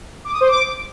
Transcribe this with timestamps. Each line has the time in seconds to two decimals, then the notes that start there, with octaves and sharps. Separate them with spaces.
0.25 D6
0.33 D#6
0.41 C5
0.49 D6